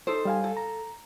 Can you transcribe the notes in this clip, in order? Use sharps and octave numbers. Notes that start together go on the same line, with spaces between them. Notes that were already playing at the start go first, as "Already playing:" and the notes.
D#4 A4 C5
G3 F5 G#5
A4
A#5